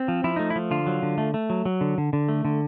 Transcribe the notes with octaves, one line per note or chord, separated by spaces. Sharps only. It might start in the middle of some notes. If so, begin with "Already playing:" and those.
Already playing: C4
F3
F3 E4
A3 D#4
E4
F3
D3 F4
F#3
D3
A3
A3
F#3
F#3
D3
D3
D3
A3
D3